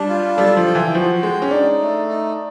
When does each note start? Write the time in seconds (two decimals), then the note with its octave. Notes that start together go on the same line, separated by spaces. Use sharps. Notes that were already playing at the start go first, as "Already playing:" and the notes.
Already playing: G3 D4
0.09 F4
0.37 G3 A4
0.57 F3
0.66 G5
0.75 E3
0.95 F3 F#4
1.22 G#3 G5
1.42 C#4
1.51 D4 D#4
1.80 A3
2.08 D#4